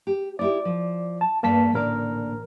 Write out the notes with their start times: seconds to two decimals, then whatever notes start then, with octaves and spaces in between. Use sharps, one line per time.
0.07 G4
0.39 D#4 E4 G4 D5
0.65 F3
1.21 A5
1.43 E2 G2 A#3 A5 B6
1.74 A1 A#2 D3 A#4 D5